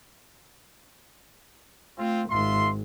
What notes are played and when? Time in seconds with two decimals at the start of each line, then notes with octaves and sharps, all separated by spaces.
1.98 A3 C4 F4
2.30 G#1 F4 E5 C6